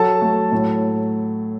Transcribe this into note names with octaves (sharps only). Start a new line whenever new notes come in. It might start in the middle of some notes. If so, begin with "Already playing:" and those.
Already playing: F#3 A4 A5
A3
A2